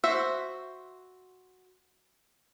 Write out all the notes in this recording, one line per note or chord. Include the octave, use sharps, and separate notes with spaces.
F#4 C5 E5